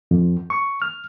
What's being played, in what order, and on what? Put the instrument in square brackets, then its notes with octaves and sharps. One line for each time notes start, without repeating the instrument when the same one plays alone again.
[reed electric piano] F2
C#6
F6